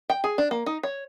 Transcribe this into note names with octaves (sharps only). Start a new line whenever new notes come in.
G5
G#4
D4
A#3
D#4
C#5